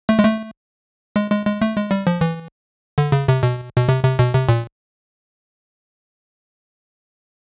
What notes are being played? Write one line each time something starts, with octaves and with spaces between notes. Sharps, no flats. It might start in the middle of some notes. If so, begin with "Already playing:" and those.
A3
G#3
A3
G#3
G#3
G#3
A3
G#3
G3
F3
E3
D3
C#3
C3
B2
B2
C3
C3
B2
C3
A#2